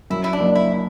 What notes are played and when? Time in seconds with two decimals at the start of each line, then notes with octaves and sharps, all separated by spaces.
0.10 F#2 E4
0.24 E4
0.33 D4
0.40 F#1
0.55 E4